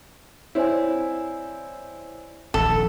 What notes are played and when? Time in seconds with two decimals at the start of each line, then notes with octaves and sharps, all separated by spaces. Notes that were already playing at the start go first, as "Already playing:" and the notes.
0.55 C4 E4 C#5 D5 G#5
2.54 D#1 A#1 D#2 A4